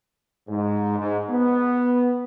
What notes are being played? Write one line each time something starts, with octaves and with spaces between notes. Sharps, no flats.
G#2
G#2
B3